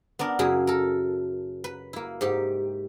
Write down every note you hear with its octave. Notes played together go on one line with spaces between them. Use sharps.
B3 D4 A#4 D5
F#2 C#3 A#3 E4 G#4
A4 A#4
B4
A#3 E4
G#2 G4